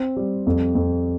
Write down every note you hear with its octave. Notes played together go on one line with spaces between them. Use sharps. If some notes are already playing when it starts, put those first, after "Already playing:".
Already playing: C4
G3
F2
F2